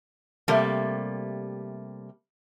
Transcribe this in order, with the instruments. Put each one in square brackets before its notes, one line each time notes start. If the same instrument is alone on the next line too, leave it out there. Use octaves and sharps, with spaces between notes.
[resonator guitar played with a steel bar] C3 G3 A3 A#3